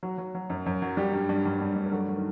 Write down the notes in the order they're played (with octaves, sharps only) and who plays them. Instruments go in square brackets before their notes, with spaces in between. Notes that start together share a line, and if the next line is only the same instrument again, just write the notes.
[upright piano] F#3 F#4
F#3
F#3
F#2
F#2
F#3
G3 G4
G2
G2
G2
G2
G2
A#4
F#3 A3 A4
F#3
D#3